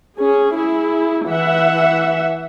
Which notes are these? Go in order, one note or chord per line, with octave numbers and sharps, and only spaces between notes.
C#4 G#4
E4 G#4
E3 E5 F#5